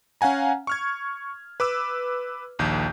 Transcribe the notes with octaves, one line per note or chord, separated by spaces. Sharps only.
C#4 F5 F#5 G#5 A#5
C#6 F6 G#6
B4 D6 E6
A#1 D#2 G6